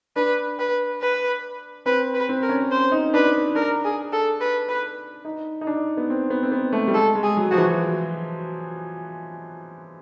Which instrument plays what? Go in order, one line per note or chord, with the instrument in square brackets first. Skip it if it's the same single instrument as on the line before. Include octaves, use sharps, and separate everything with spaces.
[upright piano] D4 [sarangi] B4
[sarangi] B4
B4
[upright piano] C4 [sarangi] B4
[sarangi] B4
[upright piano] C4
[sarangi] A#4
[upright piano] C#4
[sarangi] C5
[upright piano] D#4
[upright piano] D4 [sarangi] B4
[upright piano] D4 [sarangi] A#4
[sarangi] G#4
A4
B4
B4
[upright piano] D#4
D#4
D4
B3
C4
B3
C4
B3
A3
G3
[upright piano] G#3 [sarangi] A4
[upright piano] G#3
[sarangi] G#4
[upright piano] F#3
[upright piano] F3 [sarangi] F#4
[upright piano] E3